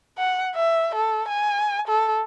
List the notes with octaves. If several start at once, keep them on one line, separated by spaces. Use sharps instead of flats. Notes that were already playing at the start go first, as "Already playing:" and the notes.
F#5
E5
A4
G#5
A4